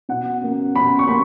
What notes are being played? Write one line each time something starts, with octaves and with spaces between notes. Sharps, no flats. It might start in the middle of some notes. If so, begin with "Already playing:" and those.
B2 F#5
A#3 C#4
B2 B5
C#6
A#3 B5